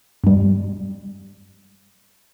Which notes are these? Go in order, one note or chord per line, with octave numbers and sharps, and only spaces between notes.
G2 G3